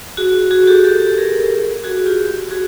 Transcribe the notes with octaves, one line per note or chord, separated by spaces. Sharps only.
F#4 G#4
F#4 G#4
G4 A4
G4 A4
A4
G#4 A#4
F#4 G#4
F4 G4
F#4 G#4